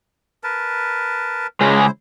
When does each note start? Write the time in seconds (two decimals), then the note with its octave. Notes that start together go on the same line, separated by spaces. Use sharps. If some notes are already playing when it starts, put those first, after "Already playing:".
0.44 A#4 B4 A5
1.61 C#3 G#3 E4 C5